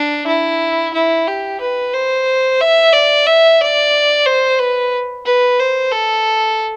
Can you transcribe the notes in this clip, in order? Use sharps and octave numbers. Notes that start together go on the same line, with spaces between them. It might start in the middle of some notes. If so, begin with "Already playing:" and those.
Already playing: D4
E4
E4
G4
B4
C5
E5
D5
E5
D5
C5
B4
B4
C5
A4